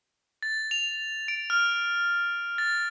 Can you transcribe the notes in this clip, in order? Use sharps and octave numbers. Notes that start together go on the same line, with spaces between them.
A6
F7
D7
F6
A6